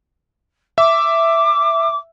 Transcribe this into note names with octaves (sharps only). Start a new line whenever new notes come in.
E5 D6